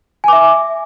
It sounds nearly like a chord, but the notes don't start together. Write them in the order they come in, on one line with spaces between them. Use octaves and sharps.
G#5 D6 E5